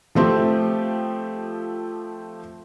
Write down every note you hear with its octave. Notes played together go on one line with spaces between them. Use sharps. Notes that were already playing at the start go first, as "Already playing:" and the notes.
F3 A3 C4 G4